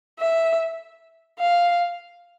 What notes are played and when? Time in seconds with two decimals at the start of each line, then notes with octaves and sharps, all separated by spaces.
0.20 E5
1.39 F5